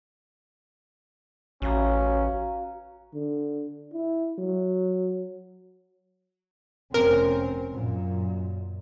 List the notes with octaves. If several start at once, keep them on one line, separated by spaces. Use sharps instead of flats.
A1 C#4 F#4 F5 A#5
D3
E4
F#3
F1 C4 C#4 A#4
F#2 A#2